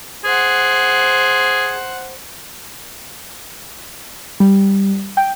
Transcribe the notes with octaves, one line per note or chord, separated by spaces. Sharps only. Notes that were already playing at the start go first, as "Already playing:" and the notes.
G#4 C5 F#5
G3
G5